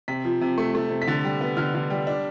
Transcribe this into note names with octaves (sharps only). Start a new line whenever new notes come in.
C3 B6
F3
C3
A3
A3
C3
B6
D3 A6
G3
B3
D3 F6
D3
G3
D4